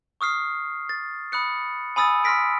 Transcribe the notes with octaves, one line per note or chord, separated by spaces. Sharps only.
C#6 D#6 F6 C7
A6
B5 D#6 F#6 C#7
G#5 B5 D#6 E6 A6
C6 E6 F6 A#6 B6 D7